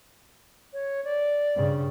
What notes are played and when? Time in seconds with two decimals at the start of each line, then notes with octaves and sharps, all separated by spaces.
0.73 C#5
1.05 D5
1.55 G2 C#3